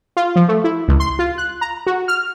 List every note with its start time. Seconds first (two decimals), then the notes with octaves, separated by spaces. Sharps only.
0.17 F4
0.36 F3
0.48 A3
0.64 E4
0.88 C#2
1.00 C6
1.19 F4
1.38 F#6
1.61 A#5
1.87 F#4
2.08 F6